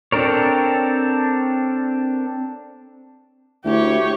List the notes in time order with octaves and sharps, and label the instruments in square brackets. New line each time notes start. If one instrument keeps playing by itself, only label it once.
[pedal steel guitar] C4 D4 A4 A#4 C#5
[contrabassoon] D2 [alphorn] E4 [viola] G4 C#5